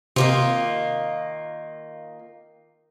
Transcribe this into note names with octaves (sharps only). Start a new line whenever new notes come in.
C3 D#3 A#3 F4